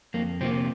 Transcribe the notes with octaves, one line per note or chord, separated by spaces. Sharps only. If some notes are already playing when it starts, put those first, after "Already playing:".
F2 A#3
C3 F3 A#3 C4